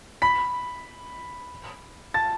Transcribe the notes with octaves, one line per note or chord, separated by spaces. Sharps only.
B5 B6
A5 A6